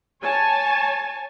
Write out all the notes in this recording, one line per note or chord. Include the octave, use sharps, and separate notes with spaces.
C#5 G#5 A5